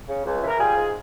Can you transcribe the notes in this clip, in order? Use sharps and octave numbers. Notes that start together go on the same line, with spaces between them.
C#3
C#2
E3
A#4
G3 F4 G#4
G#2